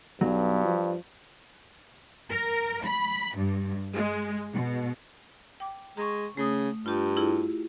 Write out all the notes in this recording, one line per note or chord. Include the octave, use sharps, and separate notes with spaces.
B1 G2 F#3
F3
A#4
B5
G2
G#3
B2
G5 D6
G#3 A#5 C#6
C#3 A3 D#6
G2 F4 G4
E4 F4 G#4